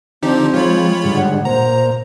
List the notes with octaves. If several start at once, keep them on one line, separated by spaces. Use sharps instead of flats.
D3 F3 C4 D#4 G4
F3 G#3 F4 C#5 B5
G#2 D3 G3
F#5
A#2 C5 A#5